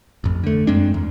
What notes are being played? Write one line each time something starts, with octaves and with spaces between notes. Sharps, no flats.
A1 F2
D3 A3
F#2 G#3 C4 D4
E2